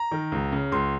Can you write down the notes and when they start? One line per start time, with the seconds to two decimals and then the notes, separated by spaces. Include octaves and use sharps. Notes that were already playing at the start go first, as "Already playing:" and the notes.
Already playing: A#5
0.11 D#3
0.32 C#2
0.52 C#3
0.72 C#2 C6